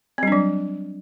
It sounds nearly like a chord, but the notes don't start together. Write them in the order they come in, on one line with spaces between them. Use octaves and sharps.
C4 G3 D4 F#3